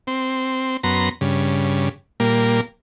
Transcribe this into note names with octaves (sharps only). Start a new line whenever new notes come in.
C4
F#2 B3 A#5 C6
G2 C#3
A#2 G3 A#3